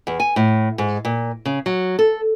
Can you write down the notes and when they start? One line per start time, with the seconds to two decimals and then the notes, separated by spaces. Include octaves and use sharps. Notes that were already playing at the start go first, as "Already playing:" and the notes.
0.07 E2
0.20 G#5
0.36 A2
0.78 G#2
1.05 A#2
1.45 C#3
1.66 F#3
1.99 A4